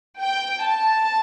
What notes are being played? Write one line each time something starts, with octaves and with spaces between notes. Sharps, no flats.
G5
A5